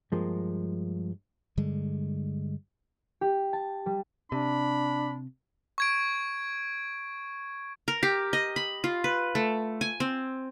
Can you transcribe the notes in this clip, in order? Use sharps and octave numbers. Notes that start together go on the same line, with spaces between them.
G2 F3 G#3 A#3
G2 D3 G3 G#3
G4
A5
G3
C3 D4 B5
C#6 G#6 D7
A#4
G4
D#5
B5
F4
B4
A3
G#5
C4